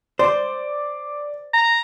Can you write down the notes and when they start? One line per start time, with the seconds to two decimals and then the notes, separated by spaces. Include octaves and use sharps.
0.19 C5 D5
1.54 A#5